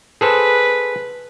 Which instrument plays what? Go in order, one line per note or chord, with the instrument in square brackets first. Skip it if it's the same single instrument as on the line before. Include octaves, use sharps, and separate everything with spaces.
[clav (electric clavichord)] G#4 A4 C5 [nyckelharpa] B4